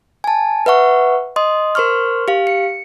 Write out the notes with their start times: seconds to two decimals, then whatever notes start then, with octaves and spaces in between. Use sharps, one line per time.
0.24 G#5 A5
0.66 B4 E5 F#5 C#6
1.36 D#5 C6 D#6
1.75 A#4 C5 C6 C#6 F6
2.28 G4 F5
2.47 C#7